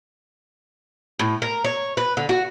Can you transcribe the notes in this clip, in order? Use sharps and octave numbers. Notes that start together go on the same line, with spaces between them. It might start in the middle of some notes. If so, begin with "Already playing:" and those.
A2
A#4
C#5
B4
D3
F#4